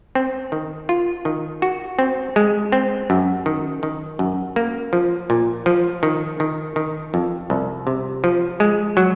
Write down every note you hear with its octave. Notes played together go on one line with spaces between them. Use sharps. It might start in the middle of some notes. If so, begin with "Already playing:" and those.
C4
D#3
F4
D#3
F#4
C4
G#3
C4
F#2
D#3
D#3
F#2
A#3
F3
A#2
F3
D#3
D#3
D#3
F2
C2
C3
F3
G#3
F#3